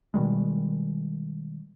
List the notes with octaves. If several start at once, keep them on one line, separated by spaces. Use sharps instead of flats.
B2 D#3 G3 G#3